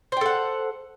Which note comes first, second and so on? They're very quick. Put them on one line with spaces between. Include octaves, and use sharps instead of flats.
C5 G5 A4 F#5